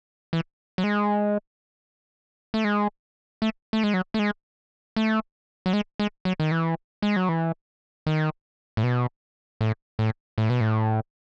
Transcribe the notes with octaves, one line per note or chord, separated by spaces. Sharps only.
E3
F#3
G#3
A3
G#3
A3
A3
G#3
F#3
A3
G#3
A3
F#3
G#3
G#3
F#3
D#3
E3
G#3
F#3
E3
D#3
A2
B2
A2
A2
A2
B2
A2